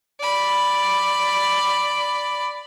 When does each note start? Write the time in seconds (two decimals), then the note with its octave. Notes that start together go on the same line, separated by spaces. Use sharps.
0.21 D5 B5